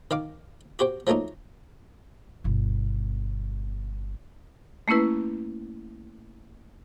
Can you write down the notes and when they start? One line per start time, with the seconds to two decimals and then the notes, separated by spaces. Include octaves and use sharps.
0.11 D#3 F5 D6
0.79 F#4 G4 C5 G5
1.07 F3 F#3 A3 A#3 D#4
2.44 G1 B2
4.88 A3 A#3 C#4 E4 B4